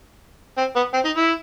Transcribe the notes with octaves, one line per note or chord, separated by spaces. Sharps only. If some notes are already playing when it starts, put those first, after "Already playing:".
C4
B3
C4
D#4
E4